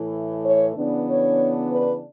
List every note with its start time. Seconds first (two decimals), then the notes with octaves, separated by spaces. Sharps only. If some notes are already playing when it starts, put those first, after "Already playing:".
Already playing: A2 E3 A3
0.42 C#5
0.75 C#3 E3 B3 D4
1.08 C#5
1.71 B4